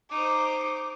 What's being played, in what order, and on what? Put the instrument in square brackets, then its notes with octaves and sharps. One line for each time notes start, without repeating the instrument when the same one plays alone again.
[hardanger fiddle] D#4 C5 [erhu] D6